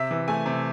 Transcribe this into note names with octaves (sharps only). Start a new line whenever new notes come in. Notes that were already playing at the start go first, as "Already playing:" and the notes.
Already playing: C3 E5
E3
A3 G#5
C3